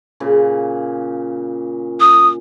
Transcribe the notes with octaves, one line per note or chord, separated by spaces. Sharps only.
A#2 C#3
D#6